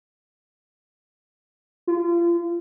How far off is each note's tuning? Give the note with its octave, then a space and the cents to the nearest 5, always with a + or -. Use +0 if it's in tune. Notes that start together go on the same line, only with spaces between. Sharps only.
F4 -35